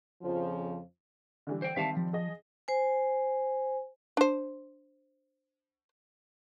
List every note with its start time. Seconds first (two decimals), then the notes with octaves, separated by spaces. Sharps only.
0.22 F2 C#3 F3
1.47 D3 E3 G3
1.62 C5 G5
1.76 D#3 G3 C4 E5 F5 A5
1.97 F3
2.13 G#4 D#5
2.68 C5 G#5
4.17 D4 C5